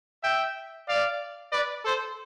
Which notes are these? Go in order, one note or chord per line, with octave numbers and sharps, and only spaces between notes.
E5 G5
D5 F5
B4 D5
A4 C5